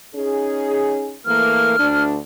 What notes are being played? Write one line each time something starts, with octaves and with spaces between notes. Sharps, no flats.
C#4 D#4 G#4
E3 A3 A#3 F6
D2 D4